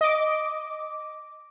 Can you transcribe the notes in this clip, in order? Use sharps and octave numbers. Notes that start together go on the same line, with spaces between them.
D#5 D6